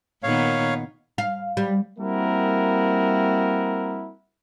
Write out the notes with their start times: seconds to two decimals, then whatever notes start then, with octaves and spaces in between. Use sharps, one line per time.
0.23 A#2 D#3 B3 C#5 F5
1.18 F5
1.57 G3
1.99 G3 A#3 C4 E4 F#4 A#4